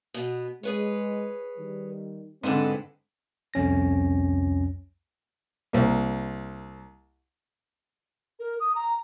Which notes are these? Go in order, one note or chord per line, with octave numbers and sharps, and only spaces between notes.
B2 B3
G#3 G#4 B4 C#5
D#3 G3
G#2 D3 C4 A4 B4 D#5
C2 F2 C#4 A#6
C2 A#3
A#4
D#6
A#5